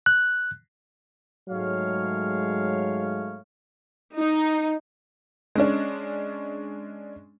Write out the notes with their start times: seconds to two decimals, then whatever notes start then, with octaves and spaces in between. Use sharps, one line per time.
0.06 F#6
1.49 G#2 F#3 G#3 A3 C#5 F5
4.15 D#4
5.55 G#3 C#4 D4